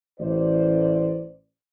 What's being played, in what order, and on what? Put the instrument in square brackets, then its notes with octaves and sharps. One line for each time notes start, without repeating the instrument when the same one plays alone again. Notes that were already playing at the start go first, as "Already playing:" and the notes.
[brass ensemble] A1 C5 D5